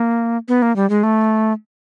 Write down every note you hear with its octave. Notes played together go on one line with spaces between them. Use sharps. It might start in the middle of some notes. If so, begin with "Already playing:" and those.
Already playing: A#3
B3
A#3
G3
G#3
A3